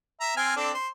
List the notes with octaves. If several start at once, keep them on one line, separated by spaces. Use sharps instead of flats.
E5 A#5
C4 G#5 F6
C4 D4 A4
C5